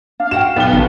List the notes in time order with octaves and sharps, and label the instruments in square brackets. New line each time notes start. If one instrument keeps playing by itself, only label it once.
[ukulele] D4 [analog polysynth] F5
[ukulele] F#4 F#5 G5 [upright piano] E7
[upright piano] B1 G7 [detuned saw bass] B3 [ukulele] D5
[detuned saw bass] A1 [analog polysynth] D3 [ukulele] F#4 B4